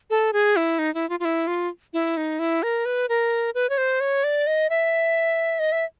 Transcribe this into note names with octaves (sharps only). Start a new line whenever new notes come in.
A4
G#4
E4
D#4
E4
F4
F4
E4
F4
E4
D#4
E4
A#4
B4
A#4
B4
C#5
C5
C#5
D5
D#5
E5
D#5
E5